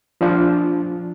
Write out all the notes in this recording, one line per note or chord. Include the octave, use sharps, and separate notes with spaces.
F3 D4 F4